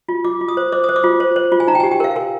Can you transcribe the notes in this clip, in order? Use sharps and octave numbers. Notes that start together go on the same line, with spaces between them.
F4
F4 D6
F4
D#6
C5
C5 D6
C5 D#6
D6
F4
C5
C5
F4
G#5
D#4 A#5
G5
G4 G#5
G5
A#4 F5
A#4 G#5